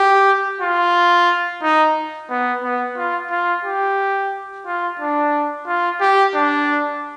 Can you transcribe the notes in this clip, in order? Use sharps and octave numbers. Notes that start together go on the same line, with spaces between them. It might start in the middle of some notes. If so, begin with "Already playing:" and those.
Already playing: G4
F4
D#4
B3
B3
F4
F4
G4
F4
D4
F4
G4
D4